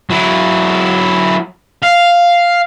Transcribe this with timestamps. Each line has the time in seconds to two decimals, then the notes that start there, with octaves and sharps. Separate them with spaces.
0.10 F#3 E4
1.83 F5